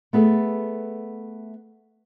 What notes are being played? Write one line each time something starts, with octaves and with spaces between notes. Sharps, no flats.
A3 B3 G#4 A4